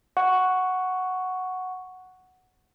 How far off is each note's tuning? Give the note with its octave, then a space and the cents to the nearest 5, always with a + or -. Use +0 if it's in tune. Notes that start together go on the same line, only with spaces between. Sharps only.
F#5 +0 C#6 +5